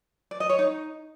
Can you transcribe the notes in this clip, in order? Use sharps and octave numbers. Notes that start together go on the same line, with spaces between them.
D5
D#5
C#5
D#4